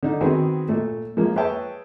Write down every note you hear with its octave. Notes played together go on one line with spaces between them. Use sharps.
D3 D#4
D#3 B3 C4 F#4 G#4
A#2 A3
F3 G#3 A#3
G#4 B4 C#5 E5 G5 A5